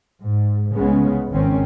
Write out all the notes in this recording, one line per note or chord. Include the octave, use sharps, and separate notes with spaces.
G#2
C2 C#3 G#3 B3 C#4
G#1 D#3 C4 C#4